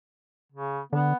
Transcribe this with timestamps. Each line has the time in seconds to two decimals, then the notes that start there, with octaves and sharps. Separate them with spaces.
0.52 C#3
0.93 D3 B3